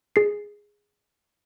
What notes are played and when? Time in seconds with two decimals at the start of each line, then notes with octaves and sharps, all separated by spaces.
0.16 G#4 C7